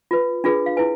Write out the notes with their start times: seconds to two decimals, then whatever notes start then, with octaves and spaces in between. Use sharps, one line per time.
0.11 F4 B4
0.44 D4 F4 G#4 B4
0.66 F5
0.77 E4 B4 G#5